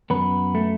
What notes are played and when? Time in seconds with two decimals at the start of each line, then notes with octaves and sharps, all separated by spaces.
0.10 F#2 B3 B4
0.55 A3